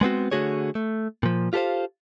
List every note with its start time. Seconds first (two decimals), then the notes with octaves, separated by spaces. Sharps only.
0.01 G#3 B3 C4 F#4
0.31 D3 A3 F#4 G#4 C#5
0.75 A3
1.23 A#2 F3
1.53 F4 G4 A4 A#4 C5 F5